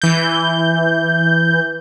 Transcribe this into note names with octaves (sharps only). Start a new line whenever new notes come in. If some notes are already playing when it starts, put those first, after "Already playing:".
E3 G6